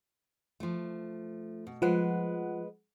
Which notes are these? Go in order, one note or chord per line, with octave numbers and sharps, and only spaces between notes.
F3 A3
B2
F3 G#3 B4 F#5